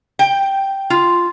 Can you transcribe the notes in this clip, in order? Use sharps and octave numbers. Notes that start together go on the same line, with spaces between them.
G5
F4